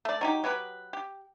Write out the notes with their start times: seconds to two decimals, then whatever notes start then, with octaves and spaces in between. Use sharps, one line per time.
0.05 A3 D5
0.21 F#3 D#4 G4
0.44 F#3 B3 G4 B4
0.93 G4